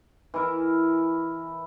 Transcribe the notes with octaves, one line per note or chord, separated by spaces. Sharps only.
E3 E4 A#4